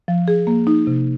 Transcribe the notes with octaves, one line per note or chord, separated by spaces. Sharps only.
F3
G#4
A#3
D#4
C3